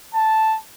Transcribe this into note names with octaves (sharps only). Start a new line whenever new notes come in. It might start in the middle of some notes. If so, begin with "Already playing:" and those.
A5